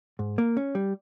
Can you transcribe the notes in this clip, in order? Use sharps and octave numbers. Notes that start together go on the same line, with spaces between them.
G#2
A#3
C#4
G3